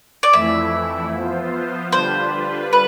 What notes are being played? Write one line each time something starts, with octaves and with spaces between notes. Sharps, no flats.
D5
F2 E3 A3 E4 E5
F3 B3 F4 C5
D3 G3 D4 F4 B4 C5
B4